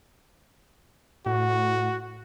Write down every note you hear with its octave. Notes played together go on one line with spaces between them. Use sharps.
A2 F#4